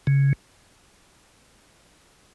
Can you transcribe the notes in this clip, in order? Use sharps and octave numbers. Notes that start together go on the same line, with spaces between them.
C#3